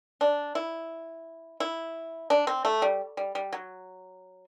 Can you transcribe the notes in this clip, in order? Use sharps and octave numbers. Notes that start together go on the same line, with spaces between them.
D4
E4
E4
D4
C4
A3
G3
G3
G3
F#3